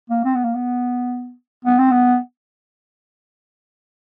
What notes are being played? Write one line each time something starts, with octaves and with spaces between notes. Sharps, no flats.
A#3
C4
B3
A#3
B3
B3
C4
B3